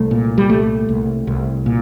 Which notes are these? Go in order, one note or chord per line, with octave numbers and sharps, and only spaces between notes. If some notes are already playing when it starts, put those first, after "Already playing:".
Already playing: C2 A3
A#2
G3
C2 A3
C2
C2
A#2